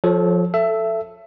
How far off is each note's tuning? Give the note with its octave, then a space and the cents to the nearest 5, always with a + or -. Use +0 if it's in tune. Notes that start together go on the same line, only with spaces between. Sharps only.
F3 +20 A4 -25 C#5 +0
A4 +5 E5 +20 E6 -5